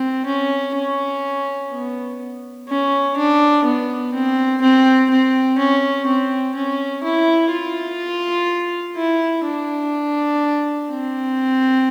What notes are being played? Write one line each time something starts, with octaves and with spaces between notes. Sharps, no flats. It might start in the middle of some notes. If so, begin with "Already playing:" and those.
Already playing: C4
C#4
C#4
B3
C#4
D4
B3
C4
C4
C4
C#4
C4
C#4
E4
F4
E4
D4
C4